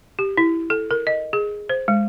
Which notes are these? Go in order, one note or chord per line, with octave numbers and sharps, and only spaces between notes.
G4
E4
A4
A#4
D#5
G#4
C5
G#3